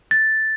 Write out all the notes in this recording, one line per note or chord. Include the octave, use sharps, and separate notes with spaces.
A6